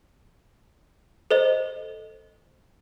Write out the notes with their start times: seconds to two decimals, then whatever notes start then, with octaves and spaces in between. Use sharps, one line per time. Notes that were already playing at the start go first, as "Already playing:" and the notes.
1.31 A4 C5 D#5